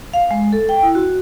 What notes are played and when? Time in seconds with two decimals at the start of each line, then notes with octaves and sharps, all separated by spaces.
0.14 F5
0.31 G#3
0.53 A4
0.69 G5
0.83 E4
0.95 F#4